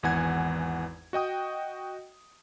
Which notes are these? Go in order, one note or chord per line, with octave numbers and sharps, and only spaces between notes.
G#1 E2 E3 F#5 G#5 G#6
F#4 D#5 G5 D#6